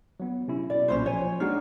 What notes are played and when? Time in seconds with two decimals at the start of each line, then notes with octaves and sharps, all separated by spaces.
0.20 F#3 B3
0.48 C3 C#4 E4
0.70 B2 D5
0.88 B1 A#2 C#4 D#4 C5
1.06 F3 C#5 G#5
1.40 G#3 D4 D#4 F#4 F6